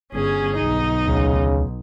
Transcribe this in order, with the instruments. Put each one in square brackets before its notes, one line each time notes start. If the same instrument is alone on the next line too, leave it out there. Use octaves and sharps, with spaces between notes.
[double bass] G1 [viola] C#4 G#4
[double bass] B1 [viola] D#4
[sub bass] D2 [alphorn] C#3